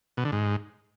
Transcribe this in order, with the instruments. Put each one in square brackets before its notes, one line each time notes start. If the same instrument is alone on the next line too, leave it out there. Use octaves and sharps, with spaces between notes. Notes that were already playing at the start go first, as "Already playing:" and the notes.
[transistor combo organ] B2
D3
G#2